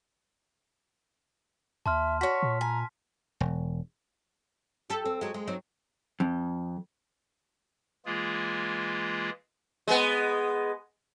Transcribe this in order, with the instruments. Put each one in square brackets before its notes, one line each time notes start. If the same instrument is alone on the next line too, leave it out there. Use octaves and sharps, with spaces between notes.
[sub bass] D#2 [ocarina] E5 [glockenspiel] A5 C6 F6
[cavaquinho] F#4 C#5 [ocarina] C#6 [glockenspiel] B6
[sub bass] A#2
[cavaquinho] G#5 [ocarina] A#5
[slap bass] E1
[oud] G4 A4
C4
F#3 G#3
G#3
F#3 C4 D#4
[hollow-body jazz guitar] F2
[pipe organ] E3 G#3 A#3 F4 G#4
[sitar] G#3 B3